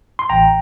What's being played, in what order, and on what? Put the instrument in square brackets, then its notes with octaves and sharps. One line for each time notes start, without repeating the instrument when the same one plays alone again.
[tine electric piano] C6
A1 G5 A#5